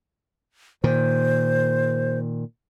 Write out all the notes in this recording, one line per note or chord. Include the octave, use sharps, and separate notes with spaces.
A#2 D#3 C5